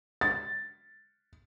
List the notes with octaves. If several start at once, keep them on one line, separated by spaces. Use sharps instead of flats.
A6